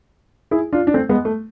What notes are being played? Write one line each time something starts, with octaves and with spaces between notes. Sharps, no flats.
E4 G#4
D4 F4
D4
A3 C4
G#3 B3
A3